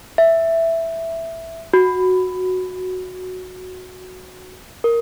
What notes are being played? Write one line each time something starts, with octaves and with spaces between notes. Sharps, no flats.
E5
F#4
A#4